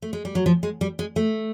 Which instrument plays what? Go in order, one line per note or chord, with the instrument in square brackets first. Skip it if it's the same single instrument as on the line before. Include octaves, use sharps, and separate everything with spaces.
[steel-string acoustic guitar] A3
G#3
G3
F#3
F3
G#3
G3
G#3
A3